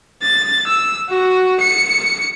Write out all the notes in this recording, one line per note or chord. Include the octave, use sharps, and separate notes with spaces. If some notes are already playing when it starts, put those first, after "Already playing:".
A6
E6
F#4
C#7